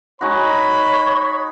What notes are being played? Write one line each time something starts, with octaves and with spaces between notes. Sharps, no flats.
G#3 D#4 F#4 C#5 B5